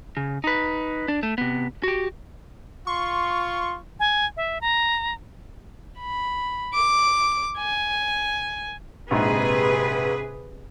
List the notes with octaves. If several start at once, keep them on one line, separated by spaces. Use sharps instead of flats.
C#3
D#4 B4
D4
A3
C3 B3
F#4 G4
F4 C6 C#6
G#5
E5
A#5
B5
D6
G#5
A#1 G#2 C3 G#4 B4